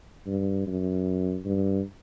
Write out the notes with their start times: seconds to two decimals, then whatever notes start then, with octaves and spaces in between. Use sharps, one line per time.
0.27 G2
0.67 F#2
1.45 G2